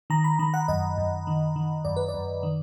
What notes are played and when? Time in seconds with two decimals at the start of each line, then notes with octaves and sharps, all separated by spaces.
0.10 D#3 A#5
0.24 B5
0.39 D#3 A#5
0.54 F#5
0.68 F#2 D#5
0.98 F#2
1.27 D#3
1.56 D#3
1.85 F#2 D5
1.97 B4
2.08 D5
2.14 F#2
2.43 D#3